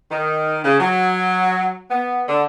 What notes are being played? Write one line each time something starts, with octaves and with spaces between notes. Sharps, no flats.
D#3
C#3
F#3
B3
D3